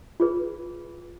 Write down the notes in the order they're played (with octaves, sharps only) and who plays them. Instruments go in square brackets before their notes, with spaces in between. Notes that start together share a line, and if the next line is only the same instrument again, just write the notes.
[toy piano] F4 G#4 B4